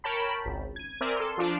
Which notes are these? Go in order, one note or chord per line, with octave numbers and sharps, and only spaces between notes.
A#4 C#5 G5 A5 B5
G#1 C#2
G#6 D#7
C4 A#4 D5 E5 G#5
A4 C6
F3 D4 F4 D5